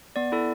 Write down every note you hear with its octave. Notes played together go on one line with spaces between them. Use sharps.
B3 D5
E4 A4